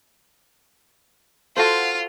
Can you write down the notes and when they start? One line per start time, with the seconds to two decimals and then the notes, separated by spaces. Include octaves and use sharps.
1.57 F4 F#4 A4 C5